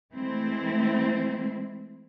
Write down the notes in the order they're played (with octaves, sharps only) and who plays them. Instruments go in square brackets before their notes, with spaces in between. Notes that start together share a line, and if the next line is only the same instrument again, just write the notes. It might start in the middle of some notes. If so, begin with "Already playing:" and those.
[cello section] E3 G#3 A3 C4 E4